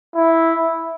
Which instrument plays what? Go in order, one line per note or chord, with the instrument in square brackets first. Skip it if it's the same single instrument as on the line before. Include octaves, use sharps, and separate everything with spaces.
[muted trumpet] E4